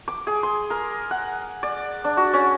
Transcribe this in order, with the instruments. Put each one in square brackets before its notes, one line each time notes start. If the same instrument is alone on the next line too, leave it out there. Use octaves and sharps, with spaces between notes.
[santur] D6
G#4
C6
A#4
F#5
D5
D4
F#4
C#4